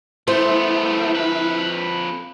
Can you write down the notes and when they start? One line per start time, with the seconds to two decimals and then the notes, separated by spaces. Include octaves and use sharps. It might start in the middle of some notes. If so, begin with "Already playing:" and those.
0.28 A3 B3 E4 C5
1.14 F2 B4